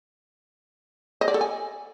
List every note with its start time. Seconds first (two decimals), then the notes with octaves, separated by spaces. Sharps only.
1.21 D#5
1.28 D5
1.34 A4
1.41 G#5